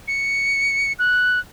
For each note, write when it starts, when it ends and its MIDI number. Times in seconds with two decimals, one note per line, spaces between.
0.08 0.93 97
0.99 1.39 90